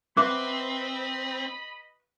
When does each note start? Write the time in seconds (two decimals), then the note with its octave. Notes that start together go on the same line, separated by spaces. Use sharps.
0.17 C4 F#4 B4 D#5 E5 B5 D6